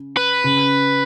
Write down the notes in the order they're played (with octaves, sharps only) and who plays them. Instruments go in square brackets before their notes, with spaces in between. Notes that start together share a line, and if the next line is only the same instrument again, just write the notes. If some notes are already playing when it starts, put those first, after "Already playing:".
Already playing: [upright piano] C#3
[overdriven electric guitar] B4
[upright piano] C#3